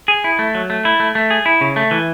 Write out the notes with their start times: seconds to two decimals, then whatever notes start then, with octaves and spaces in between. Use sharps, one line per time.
0.08 G#4
0.24 E4
0.39 A3
0.55 F#3
0.70 A3
0.85 E4
1.00 A3
1.15 A3
1.30 G#4
1.46 E4
1.61 C#3
1.76 A3
1.91 E3